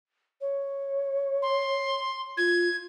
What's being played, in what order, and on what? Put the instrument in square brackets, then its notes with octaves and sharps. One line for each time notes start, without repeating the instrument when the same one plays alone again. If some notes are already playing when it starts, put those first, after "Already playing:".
[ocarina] C#5
[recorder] C6
[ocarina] F4 [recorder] G#6